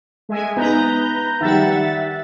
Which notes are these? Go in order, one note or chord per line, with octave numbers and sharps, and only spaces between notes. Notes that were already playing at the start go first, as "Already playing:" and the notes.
G#3 E5 G#5
B3 D#4 B4 A#5 G6
D#3 G3 E5 F#5 A6